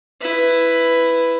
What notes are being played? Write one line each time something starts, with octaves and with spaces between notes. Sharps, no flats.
E4 B4